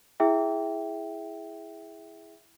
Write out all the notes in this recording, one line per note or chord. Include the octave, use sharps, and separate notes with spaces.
E4 G#4 E5 G5